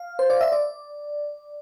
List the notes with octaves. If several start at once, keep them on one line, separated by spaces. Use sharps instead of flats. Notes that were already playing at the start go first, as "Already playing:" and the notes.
Already playing: F5
C5
D5
E5
D5